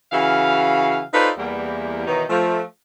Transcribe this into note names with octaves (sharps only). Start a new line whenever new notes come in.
C#3 E3 F#4 F5
D#4 F4 A4 B4 C5 D5
E2 G3 A#3
B2 D#3 E3 F#3 D#4
F3 A3